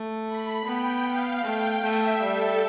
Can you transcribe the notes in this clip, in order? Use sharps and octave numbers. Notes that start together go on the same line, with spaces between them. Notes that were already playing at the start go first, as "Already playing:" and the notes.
Already playing: A3
B5
B3 G5
F5
A3 G5
A3 E5
G3 A4